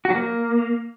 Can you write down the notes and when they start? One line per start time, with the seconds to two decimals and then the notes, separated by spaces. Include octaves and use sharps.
0.05 F#4
0.10 F#3
0.15 A#3